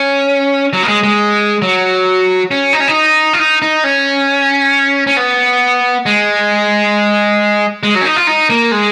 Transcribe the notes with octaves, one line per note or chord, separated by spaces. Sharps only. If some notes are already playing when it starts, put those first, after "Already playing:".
Already playing: C#4
F#3
A#3
G#3
G#3
F#3
C#4
D#4
C#4
D#4
F4
D#4
D#4
C#4
C#4
B3
G#3
G#3
F#3
C#4
D#4
F4
D#4
A#3
G#3